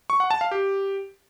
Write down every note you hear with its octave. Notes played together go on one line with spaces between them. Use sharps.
C#6
F#5
A5
F5
G4